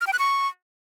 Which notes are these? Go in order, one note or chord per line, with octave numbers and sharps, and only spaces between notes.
F6
G5
F#6
C#6